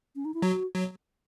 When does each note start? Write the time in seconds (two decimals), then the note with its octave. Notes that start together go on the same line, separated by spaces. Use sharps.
0.16 C#4
0.25 D#4
0.34 E4
0.42 F#3 F#4
0.74 F#3